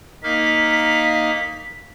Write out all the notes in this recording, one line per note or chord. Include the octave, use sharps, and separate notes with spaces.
A#3 D#4 F5 B6